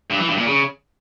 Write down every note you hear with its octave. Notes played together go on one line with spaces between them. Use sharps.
G2
E3
G2
A#2
C#3